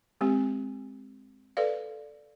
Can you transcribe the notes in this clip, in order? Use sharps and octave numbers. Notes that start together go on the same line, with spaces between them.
G#3 C4 G4
A4 B4 D5 F5